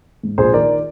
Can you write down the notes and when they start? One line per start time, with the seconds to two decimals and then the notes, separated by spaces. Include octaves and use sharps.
0.23 G#2
0.38 A#1 G#4 C5
0.53 D#3 A#4 D5